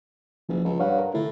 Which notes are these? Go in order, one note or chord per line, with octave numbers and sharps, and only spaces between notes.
F#1 F3
C#2
G2 C#5 F5 F#5
A#4
A2 D3 E4